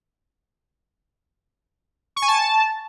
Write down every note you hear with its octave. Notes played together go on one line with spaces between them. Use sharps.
C#6
G#5
A5